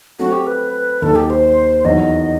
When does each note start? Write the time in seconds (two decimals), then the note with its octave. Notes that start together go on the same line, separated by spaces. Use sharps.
0.19 F#3 A3 C4 F#4
0.33 G4
0.46 B4
1.02 D#2 D#3 F#3 A4
1.16 G4
1.30 C5
1.85 E2 D#3 F#3 D#5